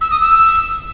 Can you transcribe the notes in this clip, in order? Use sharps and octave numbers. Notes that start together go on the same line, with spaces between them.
E6
D#6
E6